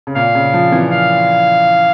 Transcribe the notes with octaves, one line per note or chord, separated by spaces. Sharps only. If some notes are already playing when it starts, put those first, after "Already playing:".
C#3
A#2 F5
C#3
F3
E3
F5